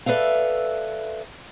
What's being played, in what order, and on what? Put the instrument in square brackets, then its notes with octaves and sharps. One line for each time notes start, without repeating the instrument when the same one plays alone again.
[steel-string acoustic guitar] A4 B4 D5 E5 F5